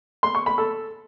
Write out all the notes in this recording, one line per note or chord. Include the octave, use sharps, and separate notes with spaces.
C6
C#6
B5
A4